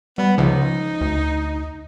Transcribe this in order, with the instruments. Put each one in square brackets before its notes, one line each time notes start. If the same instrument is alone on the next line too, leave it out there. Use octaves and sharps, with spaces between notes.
[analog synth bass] G3 [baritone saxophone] B3
[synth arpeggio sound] C#2 [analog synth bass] F3 [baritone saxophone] D#4
[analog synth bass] D2